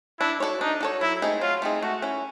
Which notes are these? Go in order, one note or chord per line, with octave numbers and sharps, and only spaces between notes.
D4 E4
F#4 A4 C#5
D4 D#4
F#4 A4 C#5
F#3 E4
A3 C4 D#4 G#4
F#3 F4
A3 C4 D#4 G#4
A3 F#4
C#4 E4